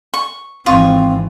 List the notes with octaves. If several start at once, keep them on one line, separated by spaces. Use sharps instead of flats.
C#6
G#1 E3 C4 F4 C#6 D#6